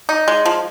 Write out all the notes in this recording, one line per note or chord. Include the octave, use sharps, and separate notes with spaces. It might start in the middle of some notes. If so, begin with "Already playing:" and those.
D#4
G#3
F3